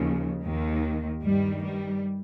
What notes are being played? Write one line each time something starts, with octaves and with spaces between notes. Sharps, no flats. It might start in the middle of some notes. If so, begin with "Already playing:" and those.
Already playing: D#2 C#3 F3
D#2 D#3
G2 D#3 G3
G3